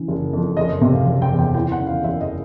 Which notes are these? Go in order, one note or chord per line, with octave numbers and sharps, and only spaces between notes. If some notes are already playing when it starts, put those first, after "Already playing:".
Already playing: C#3 E3
F#1
F2
F#1 D#5
D#5
C3 E5
F5
F#1
G5
E2
G5
E3 G5
F#5
C#3
F5
F#1 E5
D#5